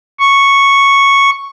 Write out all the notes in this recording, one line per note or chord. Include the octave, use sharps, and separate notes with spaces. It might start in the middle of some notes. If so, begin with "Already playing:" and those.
C#6